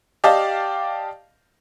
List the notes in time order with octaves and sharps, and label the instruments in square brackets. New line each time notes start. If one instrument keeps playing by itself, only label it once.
[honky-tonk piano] G4 D5 D#5 F5 A5